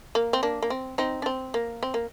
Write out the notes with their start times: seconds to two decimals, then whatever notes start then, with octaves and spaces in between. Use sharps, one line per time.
0.15 A#3
0.33 C4
0.43 A#3 D4
0.62 A#3
0.70 C4
0.98 C4 D#4
1.22 D4
1.26 C4
1.54 A#3
1.83 C4
1.94 A#3